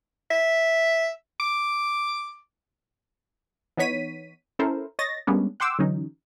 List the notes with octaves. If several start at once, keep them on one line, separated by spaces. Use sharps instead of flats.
E5
D6
E3 B3 D#4 C#5 B6 D#7
C#4 E4 A4 A#4 C5
C#5 D#5 A6 A#6
G3 G#3 A#3 B3 C#4 D4
F#5 G5 C6 D6 E6
D3 E3 F#3 C#4 D#4